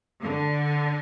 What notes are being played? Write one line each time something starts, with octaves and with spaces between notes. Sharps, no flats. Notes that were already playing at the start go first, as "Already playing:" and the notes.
D3